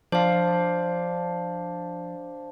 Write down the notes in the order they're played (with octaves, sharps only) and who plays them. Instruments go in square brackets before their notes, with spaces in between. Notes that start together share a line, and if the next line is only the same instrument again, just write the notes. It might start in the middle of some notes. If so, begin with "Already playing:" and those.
[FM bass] F3 [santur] D4 [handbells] C5 F5